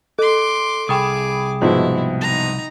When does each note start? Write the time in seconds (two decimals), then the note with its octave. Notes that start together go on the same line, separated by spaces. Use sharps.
0.19 A4 C6 D6
0.89 C2 G#4 G5 B5 D6 D#6
1.61 G#2 B2 F3 E4
2.21 D#4 A#5